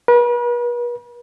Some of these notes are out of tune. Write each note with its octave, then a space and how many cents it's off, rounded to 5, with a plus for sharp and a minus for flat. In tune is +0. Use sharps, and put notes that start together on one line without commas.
B4 -40